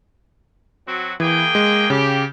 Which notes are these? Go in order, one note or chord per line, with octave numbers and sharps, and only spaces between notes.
F#3 C4 F#4
E3 A#3 G#4 G5
G#3
C#3 G4